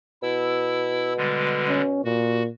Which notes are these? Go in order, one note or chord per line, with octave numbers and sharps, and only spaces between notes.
B2 E4 E6
D3 G3 G#3
C#4
A#2 F#4